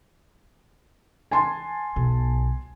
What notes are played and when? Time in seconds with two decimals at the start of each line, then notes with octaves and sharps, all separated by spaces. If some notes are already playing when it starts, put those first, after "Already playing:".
1.31 G#5 A5 C6
1.96 B1 B3